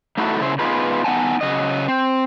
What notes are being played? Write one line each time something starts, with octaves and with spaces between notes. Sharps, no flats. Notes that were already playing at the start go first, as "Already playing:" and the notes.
A3 D#4 E4 F#4 G#4 A4
C#3 E4 C5
B3 D#4 F4 G#4 B4
B3 D#4 F#5 G#5 A5
C#3 F#3 D#5
C4